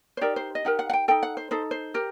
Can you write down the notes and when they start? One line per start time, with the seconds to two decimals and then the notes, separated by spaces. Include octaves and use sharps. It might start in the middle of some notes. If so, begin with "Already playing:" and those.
0.17 C5
0.21 D#4 G4 A#4 D5
0.36 C5
0.55 D#5
0.65 D#4 G4 A#4 F#5
0.79 F#5
0.90 F#5
0.93 G5
1.08 D#4 A4 G5
1.23 F#5
1.37 C5
1.51 D#4 A4 C5
1.71 C5
1.94 G4 A#4